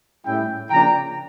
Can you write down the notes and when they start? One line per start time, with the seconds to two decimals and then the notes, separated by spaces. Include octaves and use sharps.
0.24 A2 G3 C#4 E4 E5 G5
0.70 C#3 F3 A#3 D4 G5 A#5